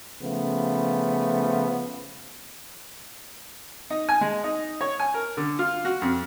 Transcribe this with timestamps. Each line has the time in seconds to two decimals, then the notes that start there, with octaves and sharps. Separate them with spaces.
0.21 C#3 F3 A3 B3
3.90 D#4
4.09 G#5
4.21 G#3
4.44 D#4
4.81 C#5
5.00 G#5
5.14 A#4
5.37 D3
5.59 F4
5.85 F#4
6.02 F2